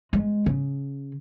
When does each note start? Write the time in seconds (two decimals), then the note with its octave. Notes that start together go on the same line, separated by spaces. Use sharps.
0.13 G#3
0.46 C#3